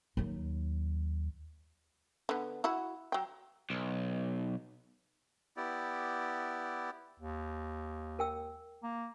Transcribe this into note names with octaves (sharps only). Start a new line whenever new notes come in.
D#2 F#3
D3 B3
E4 F#4 F#5
F#3 G5
B1
B3 E4 G4 D5
D#2
A#4 G5 E6
A#3